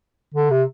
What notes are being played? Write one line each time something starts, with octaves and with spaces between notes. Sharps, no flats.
D3
C3